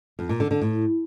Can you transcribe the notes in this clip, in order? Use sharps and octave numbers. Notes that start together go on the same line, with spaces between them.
F2
A#2
D3
D3
A2